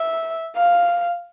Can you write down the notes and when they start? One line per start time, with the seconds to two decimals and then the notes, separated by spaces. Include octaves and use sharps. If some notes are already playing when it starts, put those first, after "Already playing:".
Already playing: E5
0.56 F5